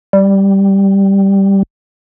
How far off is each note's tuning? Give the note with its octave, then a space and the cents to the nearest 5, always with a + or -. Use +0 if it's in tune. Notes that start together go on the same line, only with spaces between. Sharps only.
G3 +0